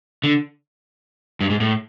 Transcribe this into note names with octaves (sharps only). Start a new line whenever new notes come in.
D3
G2
G#2
A2